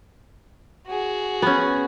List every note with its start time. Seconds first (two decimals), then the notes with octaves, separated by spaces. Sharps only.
0.86 F#4 G#4
1.42 B3 C#4